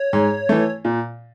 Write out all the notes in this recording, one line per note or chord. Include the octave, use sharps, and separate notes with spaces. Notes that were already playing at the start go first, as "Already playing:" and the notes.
Already playing: C#5
G#2
E3 A3
A#2